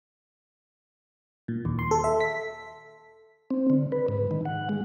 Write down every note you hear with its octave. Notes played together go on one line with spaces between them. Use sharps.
A#2
D#2
C6
A4
E5
B6
C4
D3
B4
G#2
D#3
F#5
G#3